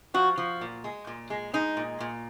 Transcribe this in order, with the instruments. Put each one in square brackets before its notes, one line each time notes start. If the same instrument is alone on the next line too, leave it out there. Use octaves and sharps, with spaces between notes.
[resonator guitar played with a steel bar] F3 F#4
F3
A#2
G#3
A#2
G#3
G#3 D#4
A#2
A#2